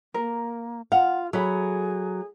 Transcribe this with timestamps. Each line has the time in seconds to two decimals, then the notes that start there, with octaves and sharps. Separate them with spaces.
0.14 A#3 A#4
0.92 F4 F5 F#5
1.33 F#3 G#4 A4 E5 B5